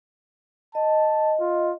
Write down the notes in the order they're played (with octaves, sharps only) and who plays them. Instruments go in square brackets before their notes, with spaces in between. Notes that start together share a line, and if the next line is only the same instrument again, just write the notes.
[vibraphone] D#5 [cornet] A5
[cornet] F4